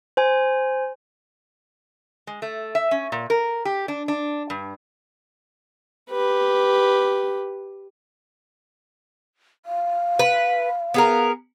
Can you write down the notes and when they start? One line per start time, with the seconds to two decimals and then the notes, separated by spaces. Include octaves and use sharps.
0.17 C5 G#5
2.27 G#3
2.42 A3
2.75 E5
2.91 C#4
3.12 A#2
3.30 A#4
3.65 G4
3.88 D4
4.08 D4
4.50 G2
6.10 G4 B4
9.66 F5
10.19 B4
10.94 B3 G#4 A#4